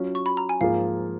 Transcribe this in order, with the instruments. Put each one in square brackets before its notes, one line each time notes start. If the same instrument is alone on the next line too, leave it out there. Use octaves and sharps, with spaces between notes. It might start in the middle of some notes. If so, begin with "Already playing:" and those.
Already playing: [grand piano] F#3 C#4 F4
[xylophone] C#6
B5
A#5
G#5
[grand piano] G#2 F3 A#3 F4 G#4 [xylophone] F5